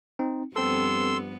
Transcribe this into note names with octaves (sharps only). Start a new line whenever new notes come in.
C4 D#4
G2 F3 B3 C4 A4 C6 E6